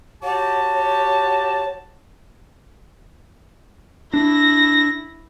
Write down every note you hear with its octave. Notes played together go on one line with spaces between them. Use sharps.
F#4 G4 C#5 A5
D4 E4 A#6